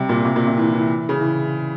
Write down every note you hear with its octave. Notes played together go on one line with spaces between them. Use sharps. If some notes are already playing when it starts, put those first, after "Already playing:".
Already playing: C3 G3
A#2
C3
A#2
C3
E3
E3
C#3
E3